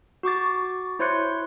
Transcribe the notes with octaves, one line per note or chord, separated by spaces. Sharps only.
F#4 C#6 D6 A6
E4 C5 C#5 C6 F#6 C#7